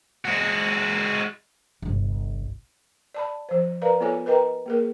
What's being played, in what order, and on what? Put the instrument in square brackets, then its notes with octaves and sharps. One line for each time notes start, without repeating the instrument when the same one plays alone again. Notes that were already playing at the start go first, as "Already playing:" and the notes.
[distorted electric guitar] G#3 F#4
[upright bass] G1 C2
[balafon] D5 A5 B5
F3 C5
A#4 B4 D5 F5 A#5
B3 F4 A4 C#5 G#5
A#4 B4 D#5 G5 A#5
A#3 G#4 A#4